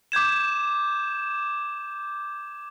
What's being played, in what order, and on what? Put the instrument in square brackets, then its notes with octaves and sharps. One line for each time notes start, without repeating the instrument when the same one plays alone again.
[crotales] D6 G6 G#6 E7